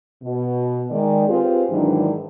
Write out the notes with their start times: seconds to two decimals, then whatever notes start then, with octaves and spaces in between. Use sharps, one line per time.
0.23 B2
0.91 D#3 G#3 D5
1.28 C4 F4 G4 G#4 B4 C5
1.71 G#2 D#3 E3 F#3 D4